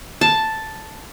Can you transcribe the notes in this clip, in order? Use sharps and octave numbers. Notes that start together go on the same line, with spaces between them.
A5